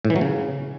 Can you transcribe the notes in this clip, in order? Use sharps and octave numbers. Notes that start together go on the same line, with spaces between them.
A2
E3
F#3
C#3